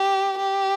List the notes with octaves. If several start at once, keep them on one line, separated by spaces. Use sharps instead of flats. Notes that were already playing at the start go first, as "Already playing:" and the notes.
Already playing: G4
G4